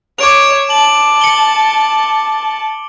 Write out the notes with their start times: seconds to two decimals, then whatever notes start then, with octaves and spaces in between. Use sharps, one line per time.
0.19 C#5 D6 D7 F7
0.70 A5 F#7
1.21 C#7 G7